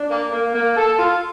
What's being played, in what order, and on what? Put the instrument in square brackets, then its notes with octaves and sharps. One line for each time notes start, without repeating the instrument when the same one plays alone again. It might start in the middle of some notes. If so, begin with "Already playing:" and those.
Already playing: [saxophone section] D4
A#3
A#3
A#3
A4
F4